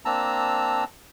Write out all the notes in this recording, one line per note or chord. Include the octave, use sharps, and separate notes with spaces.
A#3 C4 D4 A5 A#5 E6